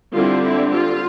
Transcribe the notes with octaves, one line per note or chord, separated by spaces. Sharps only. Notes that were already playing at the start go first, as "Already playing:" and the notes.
D3 G3 C4 E4 F4
E4
F4